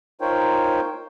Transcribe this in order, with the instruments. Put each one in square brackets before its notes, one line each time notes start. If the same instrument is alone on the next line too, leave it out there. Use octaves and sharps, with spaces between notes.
[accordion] D#4 F4 A#4 C5 C#5 G5